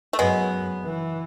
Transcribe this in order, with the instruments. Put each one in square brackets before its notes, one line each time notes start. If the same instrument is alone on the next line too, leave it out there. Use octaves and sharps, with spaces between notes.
[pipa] A3
[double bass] F#2 [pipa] G#3 B3
[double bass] E3